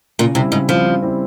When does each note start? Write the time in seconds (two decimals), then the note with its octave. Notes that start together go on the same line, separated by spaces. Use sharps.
0.19 A#2 C#3
0.35 C3 G3 C4 E4
0.52 G#2 C#3
0.69 F3 G3 C4 E4
0.86 C#3
1.02 G3 C4 E4